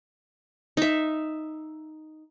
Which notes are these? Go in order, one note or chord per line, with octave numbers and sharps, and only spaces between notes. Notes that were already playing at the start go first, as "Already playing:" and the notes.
D#4 E5